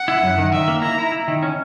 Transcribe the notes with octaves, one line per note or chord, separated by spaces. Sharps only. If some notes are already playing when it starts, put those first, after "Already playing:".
Already playing: F#5
E4
F#2
D#3
D#3 E5
A#3
E4 A#5
E4
E4
D#3
C#4